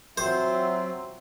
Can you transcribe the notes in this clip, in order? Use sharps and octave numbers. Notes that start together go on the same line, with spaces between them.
F#3 C4 F4 C5 E5